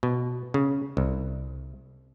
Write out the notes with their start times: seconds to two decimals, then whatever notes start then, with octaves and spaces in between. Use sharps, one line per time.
0.03 B2
0.54 C#3
0.97 C2